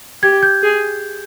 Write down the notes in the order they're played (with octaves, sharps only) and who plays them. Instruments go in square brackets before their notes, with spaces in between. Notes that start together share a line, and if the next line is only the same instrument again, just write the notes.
[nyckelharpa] G4 [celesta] G#6
[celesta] G6
[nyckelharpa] G#4